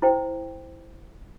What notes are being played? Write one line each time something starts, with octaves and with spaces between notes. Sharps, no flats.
E4 C5 G5